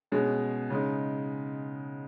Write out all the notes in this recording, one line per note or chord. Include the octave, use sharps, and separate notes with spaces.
B2 G#3 C#4 G#4
C#3 G#3 D#4